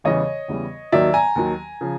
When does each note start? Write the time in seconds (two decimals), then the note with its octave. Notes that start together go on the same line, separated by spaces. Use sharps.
0.04 E2 C#3 E3 G3 C#5 D#5
0.48 E2 C#3 E3 G3
0.92 D#2 D#3 F#3 D5 E5
1.14 G#5 A#5
1.36 D#2 D#3 F#3
1.81 C#3 F3